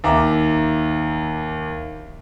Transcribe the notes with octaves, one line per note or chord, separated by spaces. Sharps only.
D#2 E5 A#5 D6